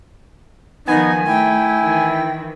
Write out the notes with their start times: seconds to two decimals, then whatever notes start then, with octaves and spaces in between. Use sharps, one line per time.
0.88 D#3 F3 B3 D#4 G#5
1.27 A3 E4 G5
1.81 D#3 E3